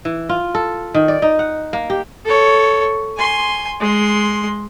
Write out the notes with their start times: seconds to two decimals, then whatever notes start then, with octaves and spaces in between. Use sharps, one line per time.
0.05 E3
0.29 F4
0.55 A4
0.95 D#3
1.08 D5
1.22 D#4
1.39 F#5
1.73 A#3
1.90 G4
2.25 A4 C#5
3.17 G#5 C6
3.80 G#3 C6